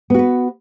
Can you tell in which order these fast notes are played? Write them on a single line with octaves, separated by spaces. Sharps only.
B3 F#4 B4